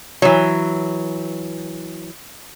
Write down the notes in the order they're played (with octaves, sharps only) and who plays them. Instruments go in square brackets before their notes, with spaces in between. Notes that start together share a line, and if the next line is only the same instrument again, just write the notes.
[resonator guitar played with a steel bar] E3 F#3